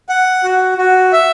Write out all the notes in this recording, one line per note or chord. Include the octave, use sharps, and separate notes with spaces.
F#5
F#4
F#4
E5